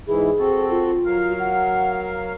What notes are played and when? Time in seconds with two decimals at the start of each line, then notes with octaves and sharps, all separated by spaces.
0.08 G#2 E3 E4 G#4
0.39 C4 F#4 A4
0.71 F4
1.05 F#3 A#4 F5
1.39 F#5